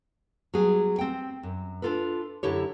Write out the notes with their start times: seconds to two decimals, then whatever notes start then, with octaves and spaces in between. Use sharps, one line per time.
0.54 F#3 G3 B3 G#4
0.98 C4 G5
1.43 F#2
1.82 D4 D#4 F4 A4 B4
2.43 F#2 D3 E4 G4 A4 C#5